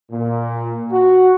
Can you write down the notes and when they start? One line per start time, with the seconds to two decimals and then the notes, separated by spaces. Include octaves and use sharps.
0.10 A#2
0.91 F#4